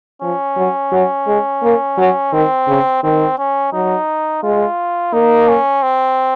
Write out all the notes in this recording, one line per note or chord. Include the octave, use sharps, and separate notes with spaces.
F3 C#4
F#3
F#3
G#3
A#3
F#3
D#3 C4
C#3
D#3 C4
C#4
F#3 D#4
G#3 F4
A#3 D#4
C#4
C4